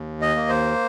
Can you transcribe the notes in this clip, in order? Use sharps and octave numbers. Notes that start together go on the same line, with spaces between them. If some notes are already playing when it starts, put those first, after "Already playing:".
Already playing: D#2
D#5
A#3
C5